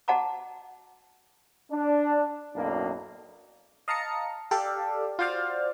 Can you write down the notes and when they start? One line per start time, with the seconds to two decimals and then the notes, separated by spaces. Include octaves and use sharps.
0.08 F#4 D#5 F#5 A5 A#5 D6
1.70 D4
2.55 B1 F#2 A2 A#3 D4
3.88 D#5 F5 A5 A#5 D#6 C#7
4.51 G4 A4 D5 F5 A5
5.19 F4 F#4 C5 D5 F5